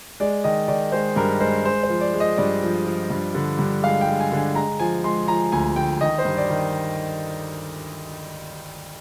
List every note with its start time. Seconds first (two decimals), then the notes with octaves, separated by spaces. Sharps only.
0.20 G#3 D5
0.44 D#3 D#5
0.68 D#3 D5
0.92 G#3 C5
1.16 G2 A#4
1.41 G#3 C5
1.65 G#3 C5
1.83 C5
1.89 F3
2.01 D5
2.14 G#3
2.20 D#5
2.37 G2 D5
2.63 F3
2.86 F3
3.10 G2
3.35 D3
3.59 G2
3.83 G#3 F5
4.01 G5
4.07 G#3
4.20 G#5
4.32 D3
4.37 G#5
4.55 G#3 A#5
4.79 F3 G#5
5.04 G#3 C6
5.28 F3 A#5
5.52 D2 G#5
5.76 D2 G5
6.01 D#3 D#5
6.19 C5
6.25 G2
6.38 D5
6.50 D#3